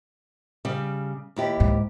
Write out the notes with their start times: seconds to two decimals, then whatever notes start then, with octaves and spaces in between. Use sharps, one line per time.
0.65 C#3 G3
1.36 D#2 E4 G4
1.60 G#2